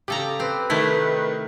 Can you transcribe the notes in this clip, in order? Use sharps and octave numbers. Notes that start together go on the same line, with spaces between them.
C#3 G4 A4 A#5
C4 B4
C3 D#3 A3 E4 B6